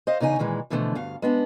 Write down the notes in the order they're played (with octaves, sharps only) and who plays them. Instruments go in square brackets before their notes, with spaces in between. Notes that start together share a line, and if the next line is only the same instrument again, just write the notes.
[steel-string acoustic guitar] C5 D#5 F5
E2 C#3 D#4 A#4 G#5
A#2 D#3 E3 G#3
B2 D3 E3 F3 G#3 A3
D2 G2 F5
G#3 B3 D4